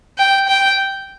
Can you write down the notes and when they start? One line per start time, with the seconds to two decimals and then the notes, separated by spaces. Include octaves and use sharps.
0.18 G5
0.48 G5